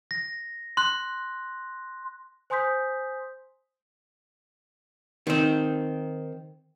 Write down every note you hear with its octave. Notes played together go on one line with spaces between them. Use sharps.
A#6
C6 F#6
C5 G#5 C6 D#6 G6 B6
D#3 C4